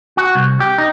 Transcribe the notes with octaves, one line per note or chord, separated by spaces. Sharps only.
F#4
C2
G4
D#4